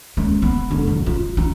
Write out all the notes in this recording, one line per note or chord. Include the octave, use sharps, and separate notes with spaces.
C#2 A#3
B3
E1 D3
G2 F#3
F4
D#4